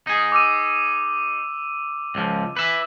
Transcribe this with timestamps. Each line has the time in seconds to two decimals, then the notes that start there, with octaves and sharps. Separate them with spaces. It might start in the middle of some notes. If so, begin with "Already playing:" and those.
0.07 D#4 G#4
0.32 D6 E6 D#7
2.15 C#2 F3
2.57 B4 E5